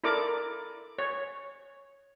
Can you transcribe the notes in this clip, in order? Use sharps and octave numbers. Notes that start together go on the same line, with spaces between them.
E4 A4 A#4 D5 D6
C#5